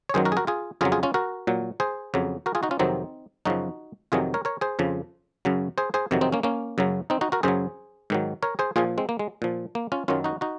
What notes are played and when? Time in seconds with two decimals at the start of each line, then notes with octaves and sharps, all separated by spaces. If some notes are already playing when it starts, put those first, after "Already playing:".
0.09 C#5
0.14 F#2 D#3 F#3 G#4 C5
0.25 F#4 A#4
0.32 G#4
0.37 F#4 A#4
0.47 F4 G#4
0.81 F2 C#3 F#3 F4 G#4
0.92 F4 G#4
1.03 C#4 F4
1.14 F#4 A#4
1.47 A#2 F#3
1.80 G#4 C5
2.14 F2 C#3 F#3
2.46 F#4 A#4
2.55 F4 G#4
2.63 D#4 F#4
2.71 C#4 F4
2.79 F2 C3 D#3 F#3 C4 D#4
3.45 F#2 C#3 F3 D#4 F#4
4.12 F2 C3 D#3 F#3 F4 G#4
4.34 A#4 C#5
4.45 A#4 C#5
4.61 G#4 C5
4.79 F2 C#3 F3
5.45 F#2 C#3 F#3
5.78 G#4 C5
5.94 G#4 C5
6.11 F2 C3 D#3 F#3
6.21 C4 D#4
6.32 A#3 C#4
6.43 A#3 C#4
6.78 F#2 C#3 F#3
7.10 C4 D#4
7.21 D#4 F#4
7.32 F#4 A#4
7.43 F#2 C#3 F#3 G#4 C5
8.10 G#2 D#3 F#3
8.43 A#4 C#5
8.59 G#4 C5
8.76 A#2 F3 F4 G#4
8.98 G#3 C4
9.09 A#3
9.19 G#3
9.42 A#2 F3
9.75 A#3
9.92 C#4 F4
10.08 F#2 D#3 F#3 C#4 F4
10.24 D#4 F#4
10.41 D#4 F#4